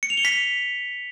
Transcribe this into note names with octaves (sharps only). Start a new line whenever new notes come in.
C#7
F7
G7
B6